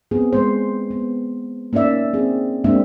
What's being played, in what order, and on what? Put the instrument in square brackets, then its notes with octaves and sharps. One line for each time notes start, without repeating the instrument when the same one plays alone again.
[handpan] B3 C4 G#4
G#3 C5
B3
A#3 C#4 D#4 D5 E5
C4 G#4
G#3 A#3 C4 D4 E5